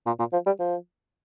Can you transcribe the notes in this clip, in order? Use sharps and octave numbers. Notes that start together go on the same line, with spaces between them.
A#2
A#2
F3
G3
F3